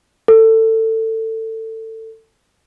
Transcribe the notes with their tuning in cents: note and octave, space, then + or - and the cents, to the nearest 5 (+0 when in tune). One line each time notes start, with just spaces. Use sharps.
A4 +20